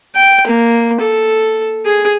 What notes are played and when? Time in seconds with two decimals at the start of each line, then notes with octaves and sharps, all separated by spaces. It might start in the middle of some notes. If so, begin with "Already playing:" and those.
0.15 G5
0.47 A#3
1.01 A4
1.85 G#4